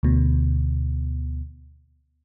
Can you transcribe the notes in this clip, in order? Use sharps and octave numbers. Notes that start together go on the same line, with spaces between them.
D2 B2